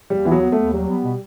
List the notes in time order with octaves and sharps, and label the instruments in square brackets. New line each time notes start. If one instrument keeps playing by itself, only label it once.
[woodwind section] D#2 [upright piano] G3
[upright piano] E3 [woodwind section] B3
[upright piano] F#3
[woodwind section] B3
[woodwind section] D#2 [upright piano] A3
[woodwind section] F#3 [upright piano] G3
[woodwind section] B3
B2